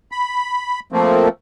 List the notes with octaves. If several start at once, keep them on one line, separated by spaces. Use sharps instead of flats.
B5
F3 A3 A#3 C4